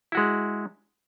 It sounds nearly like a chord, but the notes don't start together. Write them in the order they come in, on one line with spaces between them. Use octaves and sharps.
E4 F#4 G#3